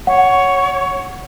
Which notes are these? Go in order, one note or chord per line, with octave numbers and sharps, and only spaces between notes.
C#5 F#5